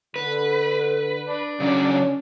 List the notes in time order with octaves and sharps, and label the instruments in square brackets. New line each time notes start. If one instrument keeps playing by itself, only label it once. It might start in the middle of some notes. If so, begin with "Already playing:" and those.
[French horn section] D3 [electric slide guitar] B4
[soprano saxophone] D4
[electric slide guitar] C#3 F#3 D5 [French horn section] C#4